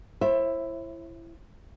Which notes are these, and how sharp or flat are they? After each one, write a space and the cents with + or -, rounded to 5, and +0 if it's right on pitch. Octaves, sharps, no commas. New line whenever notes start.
E4 +20 C5 +45 E5 +0